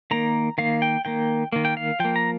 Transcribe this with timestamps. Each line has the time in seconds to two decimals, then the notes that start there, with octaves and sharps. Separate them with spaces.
0.11 D#3 A#3 A#5
0.58 D#3 A#3 F5
0.82 G5
1.05 D#3 A#3 G5
1.52 D#3 A#3
1.65 G5
1.77 F5
2.00 F3 A#3 G5
2.16 A#5